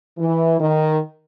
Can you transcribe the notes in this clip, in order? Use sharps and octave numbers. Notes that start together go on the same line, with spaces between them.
E3
D#3